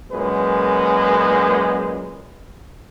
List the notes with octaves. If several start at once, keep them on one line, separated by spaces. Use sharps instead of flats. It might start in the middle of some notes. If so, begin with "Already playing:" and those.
F#2 A#2 G#3 B4